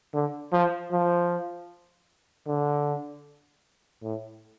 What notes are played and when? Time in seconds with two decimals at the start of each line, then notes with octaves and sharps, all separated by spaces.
0.14 D3
0.53 F3
0.92 F3
2.47 D3
4.03 A2